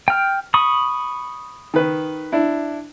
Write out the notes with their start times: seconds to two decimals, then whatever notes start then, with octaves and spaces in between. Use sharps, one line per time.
0.08 G5 F6
0.54 B5 C#6 D#6
1.74 D#3 B4
2.32 D4 E4